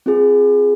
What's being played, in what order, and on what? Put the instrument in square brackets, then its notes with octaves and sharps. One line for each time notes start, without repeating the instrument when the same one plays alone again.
[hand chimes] C4 F4 G#4